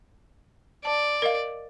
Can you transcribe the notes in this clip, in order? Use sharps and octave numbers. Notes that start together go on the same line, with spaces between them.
D5 A5
A#4 D#5 F5